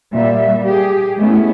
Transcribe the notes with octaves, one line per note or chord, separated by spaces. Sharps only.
A#2 G3 E5
G4 G#4
G#3 A3 B3 C#4 E4